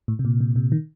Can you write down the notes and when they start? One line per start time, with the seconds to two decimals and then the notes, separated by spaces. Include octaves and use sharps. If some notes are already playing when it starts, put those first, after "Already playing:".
0.08 A2
0.19 C3
0.25 A#2
0.41 C3
0.56 C3
0.72 D#3